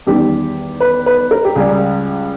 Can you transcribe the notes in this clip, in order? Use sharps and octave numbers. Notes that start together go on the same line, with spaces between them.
E2 D#3 G3 G4
B4
B4
A#4
G4
C#2 C#3 G3 G#4